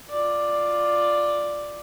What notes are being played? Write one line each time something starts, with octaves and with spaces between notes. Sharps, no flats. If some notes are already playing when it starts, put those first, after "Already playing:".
F4 D5